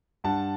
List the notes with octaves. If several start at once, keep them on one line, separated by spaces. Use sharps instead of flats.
G2 F#5 A5